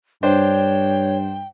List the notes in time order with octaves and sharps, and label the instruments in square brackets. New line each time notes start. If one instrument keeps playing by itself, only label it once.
[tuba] G2 [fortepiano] D4 C5 [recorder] C#5 [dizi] G5